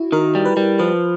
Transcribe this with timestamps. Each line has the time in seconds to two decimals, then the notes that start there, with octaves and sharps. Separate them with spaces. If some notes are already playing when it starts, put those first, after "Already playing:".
Already playing: E4 F#4
0.12 D#3 A#4
0.35 G3
0.45 B4
0.57 G3
0.79 F3 B4